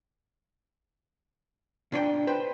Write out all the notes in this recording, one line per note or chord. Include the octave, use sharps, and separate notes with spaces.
A#2 D4 C#5 G5
B4 C5 G5